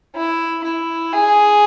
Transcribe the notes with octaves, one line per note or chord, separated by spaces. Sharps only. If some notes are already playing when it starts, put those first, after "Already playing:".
E4
E4
G#4